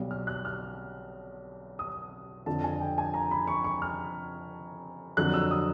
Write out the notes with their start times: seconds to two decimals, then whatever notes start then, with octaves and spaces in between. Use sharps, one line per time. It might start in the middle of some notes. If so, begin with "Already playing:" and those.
Already playing: B1 B2 G3
0.11 F6
0.27 F#6
0.45 F6
1.79 D#6
2.46 F2 D3 F3 A5
2.64 G#5
2.81 G5
2.98 G#5
3.14 A#5
3.31 B5
3.47 C#6
3.64 C#6
3.82 F6
5.17 F2 D3 F#3 F#6
5.34 E6
5.51 D#6